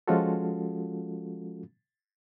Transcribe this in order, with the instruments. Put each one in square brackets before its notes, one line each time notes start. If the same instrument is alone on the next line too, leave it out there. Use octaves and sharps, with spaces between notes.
[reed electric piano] F3 G#3 C#4 F4 F#4 A4